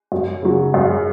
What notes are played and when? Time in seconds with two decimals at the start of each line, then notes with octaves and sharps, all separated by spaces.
0.12 F#2
0.42 C#3 F#3
0.74 F#2